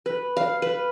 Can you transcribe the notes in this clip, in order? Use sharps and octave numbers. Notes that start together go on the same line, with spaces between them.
B4
F5
B4